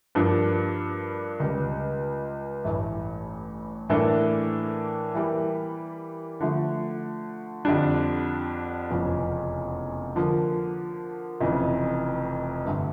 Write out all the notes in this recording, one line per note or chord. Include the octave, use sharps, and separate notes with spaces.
G2 F3 A#3 D4
C#2 C#3 G3
A1 G2 E3 A3
A2 E3 A#3 D4 A4
E3 G3 A#3 E4 G4
D3 F3 A3
F2 D3 G3 D4
F1 E2 C#3 F3 C#4
D3 F3 A#3
F1 F2 C#3 E3
G2 D3 A3